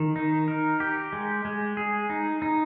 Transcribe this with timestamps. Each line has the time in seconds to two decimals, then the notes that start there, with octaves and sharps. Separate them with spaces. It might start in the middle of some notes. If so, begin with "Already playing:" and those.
Already playing: D#3
0.16 D#4
0.48 A#4
0.80 G4
1.13 G#3
1.45 G#3
1.77 G#4
2.10 D#4
2.42 D#4